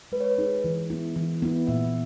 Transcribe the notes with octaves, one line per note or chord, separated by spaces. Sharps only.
G#3 B4
C#5
B4
D#4 G#4
E3
B3 E4
E3
B3 E4
A#2 E5